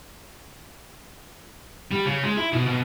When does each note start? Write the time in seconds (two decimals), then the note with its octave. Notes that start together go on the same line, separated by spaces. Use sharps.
1.91 G3
2.05 C#3
2.23 G#3
2.37 E4
2.53 B2
2.66 B2